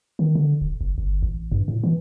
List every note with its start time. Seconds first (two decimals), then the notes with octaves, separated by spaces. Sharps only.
0.19 D#3
0.35 D3
0.61 D#1
0.81 F#1
0.98 G1
1.23 A1
1.52 G2
1.68 A2
1.84 E3